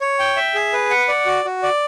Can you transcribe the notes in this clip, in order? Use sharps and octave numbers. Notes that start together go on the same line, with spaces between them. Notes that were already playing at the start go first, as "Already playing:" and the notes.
C#5
G5
E5
G#4
B4
F#5
D5
F#4
F#4
D5